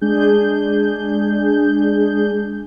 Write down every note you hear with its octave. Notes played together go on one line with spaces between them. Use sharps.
G#3 D4 G#4 G6